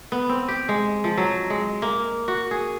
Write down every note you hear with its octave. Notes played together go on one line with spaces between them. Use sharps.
B3
C4
G4
G#3
F3
F#3
G#3
A#3
F#4
G#4